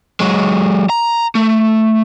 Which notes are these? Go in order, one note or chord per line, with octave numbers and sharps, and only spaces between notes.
F#3 G#3
A#5
A3